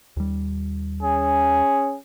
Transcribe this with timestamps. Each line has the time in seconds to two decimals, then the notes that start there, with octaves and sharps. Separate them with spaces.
0.17 D#2 G3
1.03 C#4 G#4